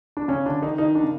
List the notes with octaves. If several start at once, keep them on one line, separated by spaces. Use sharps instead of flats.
D4
C#3 C#4
D3 D4
D#3 D#4
D#3 D#4
D4
C#3